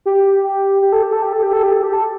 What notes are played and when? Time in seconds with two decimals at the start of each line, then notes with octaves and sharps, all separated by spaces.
0.06 G4
0.44 G4
0.82 G4
0.92 A4
1.03 G4
1.13 A4
1.23 G4
1.33 A4
1.43 G4
1.53 A4
1.63 G4
1.73 A4
1.83 G4
1.93 A4